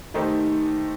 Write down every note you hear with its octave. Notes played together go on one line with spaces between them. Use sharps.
D#3 A3 D#4 G4 C5